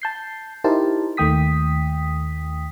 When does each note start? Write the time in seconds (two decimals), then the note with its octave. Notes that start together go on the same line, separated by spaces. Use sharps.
0.02 A5 G6 C7
0.64 D#4 E4 G4 A#4 C5 A5
1.17 D#2 D#3 A3 G5 D#6 B6